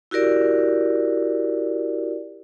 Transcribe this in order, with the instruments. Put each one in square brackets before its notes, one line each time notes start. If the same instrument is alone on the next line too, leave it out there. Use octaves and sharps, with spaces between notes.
[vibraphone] E4 F#4 G4 A#4 D5